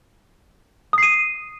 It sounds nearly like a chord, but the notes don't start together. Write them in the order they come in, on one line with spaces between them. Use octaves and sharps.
D#6 C7 D#7